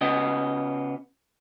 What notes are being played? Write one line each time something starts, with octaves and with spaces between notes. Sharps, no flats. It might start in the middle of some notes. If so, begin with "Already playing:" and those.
C#3 B3 D#5